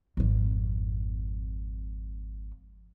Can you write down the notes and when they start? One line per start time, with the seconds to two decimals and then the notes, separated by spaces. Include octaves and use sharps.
0.17 G#1 F2